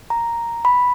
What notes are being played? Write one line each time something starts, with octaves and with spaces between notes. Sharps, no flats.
A#5
B5